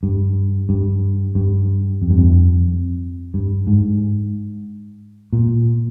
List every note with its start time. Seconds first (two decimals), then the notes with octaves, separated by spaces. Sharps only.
0.03 G2
0.69 G2
1.35 G2
2.02 F2
2.10 G2
2.18 F2
3.34 G2
3.67 G#2
5.33 A#2